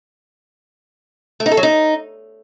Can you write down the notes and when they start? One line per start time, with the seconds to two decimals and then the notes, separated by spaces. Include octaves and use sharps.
1.40 A3
1.46 D#4
1.52 A4
1.57 F#3
1.63 D#4